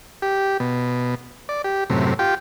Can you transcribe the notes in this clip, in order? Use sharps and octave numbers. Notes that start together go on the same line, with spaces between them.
G4
B2
D5
G4
F#2 A2 C3
F4 G4 G5